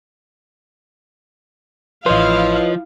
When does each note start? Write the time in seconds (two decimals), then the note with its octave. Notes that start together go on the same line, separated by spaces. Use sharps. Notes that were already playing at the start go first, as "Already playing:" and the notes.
2.06 A1 F3 E4 B4 C#5 D#5 F5 C6